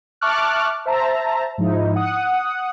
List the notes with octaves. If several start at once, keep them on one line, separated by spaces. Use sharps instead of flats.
E5 A5 C#6 D6 F6 F#6
C5 E5 A5 A#5
G#2 F3 D#4 E4
F#5 D#6